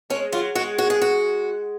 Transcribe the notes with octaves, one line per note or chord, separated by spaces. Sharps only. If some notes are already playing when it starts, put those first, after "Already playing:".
G#3 C#4
F#3 F4
G#3 F#4
F#4
G#4
F#4